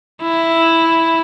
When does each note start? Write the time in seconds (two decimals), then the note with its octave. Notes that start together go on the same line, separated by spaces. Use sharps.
0.22 E4